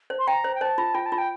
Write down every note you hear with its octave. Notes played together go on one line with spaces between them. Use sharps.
C5
C6
G5 A#5
C5
G5
C5 A5
F4
F4 G5
A5
F4
G5